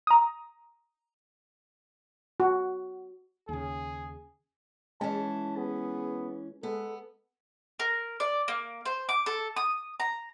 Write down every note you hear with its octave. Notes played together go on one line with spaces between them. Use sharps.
A#5 D#6
F#4
D#2 C#3 G#4
E3 G#3 C#4 A5
B3 G#4
G#3 B3 A4
A#4
D5
A#3
C5
D6
A4
D#6
A#5